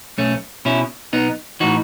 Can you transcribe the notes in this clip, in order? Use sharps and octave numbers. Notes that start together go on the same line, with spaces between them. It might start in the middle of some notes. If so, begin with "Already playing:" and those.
B1 A3 C#4
B2 C#4 E4
B1 B3 D#4
A2 E3 D#4 F#4